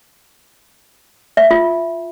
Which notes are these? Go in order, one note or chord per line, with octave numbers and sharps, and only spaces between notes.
E5
F4